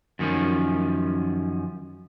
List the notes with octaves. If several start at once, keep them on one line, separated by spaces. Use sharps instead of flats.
F#2 D#3 F3 C#4